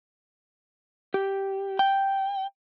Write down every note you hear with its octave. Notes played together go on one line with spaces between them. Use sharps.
G4
G5